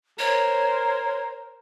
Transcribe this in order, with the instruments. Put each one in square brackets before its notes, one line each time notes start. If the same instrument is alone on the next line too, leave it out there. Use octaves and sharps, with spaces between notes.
[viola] A#4 C5 [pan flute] C#5